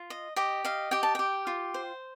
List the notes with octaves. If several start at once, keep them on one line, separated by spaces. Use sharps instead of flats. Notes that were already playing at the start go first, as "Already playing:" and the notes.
Already playing: F4
D#5
G4 D#5
D#5 F5
G4 G5
A5
G4 G5
F4
C5